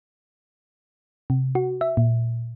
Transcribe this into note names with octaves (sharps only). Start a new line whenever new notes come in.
C3
F#4
E5
A#2